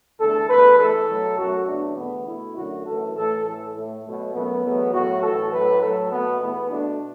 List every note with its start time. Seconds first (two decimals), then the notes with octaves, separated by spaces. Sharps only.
0.20 E2 D3 A3 A4
0.49 E2 D3 A3 B4
0.79 E2 E3 A3 A4
1.09 B2 F#3 A3
1.38 F#2 F#3 A3 F#4
1.67 E2 B2 F#3 A3 D4
1.97 E2 D3 A3 B3
2.27 B2 A3 E4
2.56 F#2 D3 A3 F#4
2.86 F#2 E3 A3 A4
3.16 A2 E3 A3 A4
3.46 A2 E3 A3
3.75 A2 A3
4.05 B2 F#3 A3
4.34 F#2 F#3 A3 B3
4.64 E2 B2 F#3 A3
4.93 A2 F#3 A3 F#4
5.23 A2 E3 A3 A4
5.53 A2 F#3 A3 B4
5.82 A2 F#3 A3 A4
6.12 B2 A3 B3
6.41 E2 E3 A3 B3
6.71 B2 A3 D4